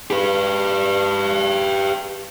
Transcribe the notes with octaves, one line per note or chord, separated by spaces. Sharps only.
G4 B4